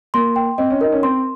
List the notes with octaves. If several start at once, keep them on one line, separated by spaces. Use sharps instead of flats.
A#3 C6
G5
C4 D#5
C#4
D#4 A#4
C#4
C4 C6